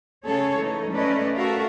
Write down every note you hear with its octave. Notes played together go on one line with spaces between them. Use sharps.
C#3 A3 G#4 A4 C#5
E3 A3 D#4
A3 C#4 A4 B4 D5 D#5
F#4 A4 A#4 E5 F5